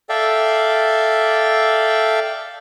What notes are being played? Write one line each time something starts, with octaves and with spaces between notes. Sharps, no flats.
A4 D5 E5 F5 G5